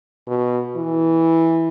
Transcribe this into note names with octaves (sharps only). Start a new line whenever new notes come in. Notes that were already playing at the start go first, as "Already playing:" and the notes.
B2
E3